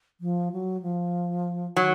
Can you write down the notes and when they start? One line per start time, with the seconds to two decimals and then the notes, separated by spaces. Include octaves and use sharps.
0.21 F3
0.52 F#3
0.82 F3
1.76 D#3 F#3